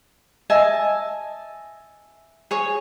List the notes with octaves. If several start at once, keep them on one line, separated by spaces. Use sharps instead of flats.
D#5 E5 G#5 A5
G#4 C#5